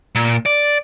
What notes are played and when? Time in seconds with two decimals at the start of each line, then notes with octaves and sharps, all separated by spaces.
0.15 A#2
0.46 D5